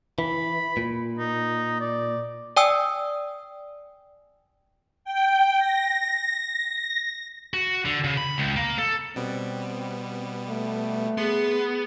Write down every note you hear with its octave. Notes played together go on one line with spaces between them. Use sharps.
E3 B5
A#2
D#4
D5
D5 G5 G#5 D#6 E6
G5
A#6
F#4
D3
C#3
B5
C#2
A#3
A4
B2 G3 B3 C4
A3
B3 G#4 C6